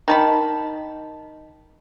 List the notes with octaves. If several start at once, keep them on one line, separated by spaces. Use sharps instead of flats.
D#3 A5 B5